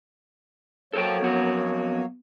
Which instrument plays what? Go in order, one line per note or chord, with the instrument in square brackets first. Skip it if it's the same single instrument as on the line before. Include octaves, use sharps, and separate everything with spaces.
[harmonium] F#3 A#3 C#5 [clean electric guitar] A4 C5 G5
[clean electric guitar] F2 F#4 [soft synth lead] B3